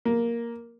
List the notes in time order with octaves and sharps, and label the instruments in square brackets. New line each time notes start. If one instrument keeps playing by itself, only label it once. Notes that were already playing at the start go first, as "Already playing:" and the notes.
[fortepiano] A#3